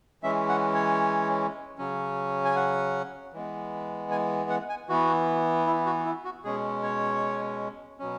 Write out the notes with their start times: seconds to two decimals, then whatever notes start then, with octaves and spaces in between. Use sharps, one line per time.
0.23 E3 G#3 C#4 E5
0.49 F#5
0.74 C#5
1.78 C#3 F#3 C#4
2.45 G#5
2.56 F#5
3.33 E3 G#3 B3
4.11 G#5
4.50 F#5
4.69 G#5
4.89 E3 B3 F#4
5.66 E4
5.86 F#4
6.05 E4
6.25 F#4
6.44 B2 G#3 C#4 G#4
6.83 C#5
7.99 B2 F#3 C#4